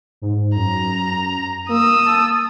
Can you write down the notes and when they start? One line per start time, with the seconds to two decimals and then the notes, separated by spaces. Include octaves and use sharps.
0.22 G#2
0.55 F#2 A#5
1.69 A#3 D#6 E6
2.06 A5